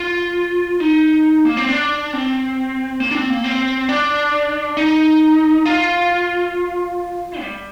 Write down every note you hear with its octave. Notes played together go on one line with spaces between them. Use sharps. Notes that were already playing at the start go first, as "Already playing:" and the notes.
Already playing: F4
D#4
A#3
C4
D4
C4
A#3
D4
C4
A#3
C4
D4
D#4
F4
G3